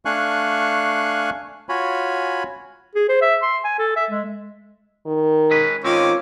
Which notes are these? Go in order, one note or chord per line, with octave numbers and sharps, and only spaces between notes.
A3 D4 F5 G#5 C#6 F#6
F4 F#4 C#5 G#5 B5
G#4
C5
E5
C6
G#5
A4
E5
G#3
D#3
G#3 C#4 B4
D#3 G#3 C4 C#4 F4 D6